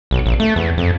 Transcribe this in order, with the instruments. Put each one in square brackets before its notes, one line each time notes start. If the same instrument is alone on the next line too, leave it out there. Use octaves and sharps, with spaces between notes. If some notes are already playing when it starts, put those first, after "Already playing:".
[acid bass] B1
A#1
A3
E2
F2